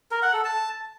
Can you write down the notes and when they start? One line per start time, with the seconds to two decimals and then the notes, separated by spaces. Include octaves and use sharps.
0.11 A#4
0.22 F#5
0.33 A4
0.44 A5